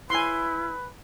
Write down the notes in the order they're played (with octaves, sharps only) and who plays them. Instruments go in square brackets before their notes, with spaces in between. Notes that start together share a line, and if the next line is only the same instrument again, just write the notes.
[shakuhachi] E4 [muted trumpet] B4 [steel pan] G#5 C6